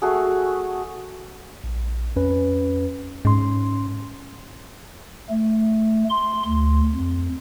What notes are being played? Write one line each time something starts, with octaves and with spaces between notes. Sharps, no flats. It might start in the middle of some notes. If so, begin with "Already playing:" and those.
A3 F#4 G#4
A#1
F2 C#4 B4
G#2 C#4 C6
A3
C6
D2
F2